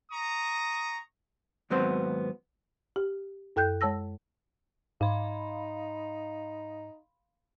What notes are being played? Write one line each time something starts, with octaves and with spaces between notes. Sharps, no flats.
A#5 C#6 D#6
D#2 G#2 F#3 B3 C4 C5
G4
F#2 A4 G5 F#6 G6
G#3 C#5 A5 E6 A#6
G#2 D#4 F5 B5 C6